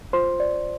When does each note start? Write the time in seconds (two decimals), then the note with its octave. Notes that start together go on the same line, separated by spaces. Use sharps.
0.13 F4 C5 C6
0.40 D5